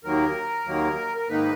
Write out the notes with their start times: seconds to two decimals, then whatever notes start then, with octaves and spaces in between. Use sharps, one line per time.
0.04 D#2 D#3 F#3 A#3 A#4
0.66 D#2 D#3 F#3 A#3
1.17 A#4
1.29 G#2 D#3 A#3 D#4 B4